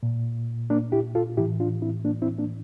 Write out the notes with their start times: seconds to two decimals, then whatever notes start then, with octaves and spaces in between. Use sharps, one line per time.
0.03 A#2
0.70 A#3 D4
0.92 E4 G4
1.15 F4 A4
1.37 A2 E3 E4 G4
1.60 D4 F4
1.82 C4 E4
2.05 A#3 D4
2.22 C4 E4
2.38 A#3 D4